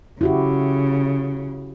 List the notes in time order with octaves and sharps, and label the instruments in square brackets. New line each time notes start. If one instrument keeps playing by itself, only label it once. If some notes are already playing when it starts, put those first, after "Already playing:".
[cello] C#3 [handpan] E4 F#4 G4